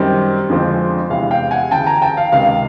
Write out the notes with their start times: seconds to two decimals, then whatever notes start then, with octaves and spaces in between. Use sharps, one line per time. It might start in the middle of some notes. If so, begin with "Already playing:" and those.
Already playing: F#2 D#3 G3 C4
0.49 F2 D3 F3 G#3 C4
1.10 E2 C3 E3 G#3 F5
1.31 F5 G5
1.51 F#5 G#5
1.71 D2 C#3 E3 G5 A5
1.87 G#5 A#5
2.02 G5 A5
2.17 F5
2.32 C#2 C3 D#3 F5